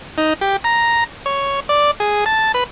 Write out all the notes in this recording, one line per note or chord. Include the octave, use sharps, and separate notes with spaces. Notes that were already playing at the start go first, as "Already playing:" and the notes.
D#4
G4
A#5
C#5
D5
G#4
A5
B4